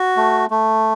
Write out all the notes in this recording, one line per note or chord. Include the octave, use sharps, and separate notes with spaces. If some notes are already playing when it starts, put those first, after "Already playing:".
Already playing: F#4
A3
A3